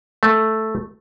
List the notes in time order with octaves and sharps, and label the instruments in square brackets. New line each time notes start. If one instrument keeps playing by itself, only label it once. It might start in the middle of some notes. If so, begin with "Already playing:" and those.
[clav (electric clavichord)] A3